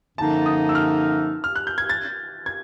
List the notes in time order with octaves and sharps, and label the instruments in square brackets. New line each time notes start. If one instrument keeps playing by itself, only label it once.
[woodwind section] F#2 D3 F3 A#3 D#4 [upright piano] A5
[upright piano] D#6
E6
F6
F6
F#6
G6
G#6
A6
G#6